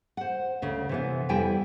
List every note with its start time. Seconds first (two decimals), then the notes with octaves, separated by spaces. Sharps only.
0.17 C5 F#5
0.62 D2 C#3
0.89 C3 E3 B3
1.29 F2 G3 B3 E4 G5 G#5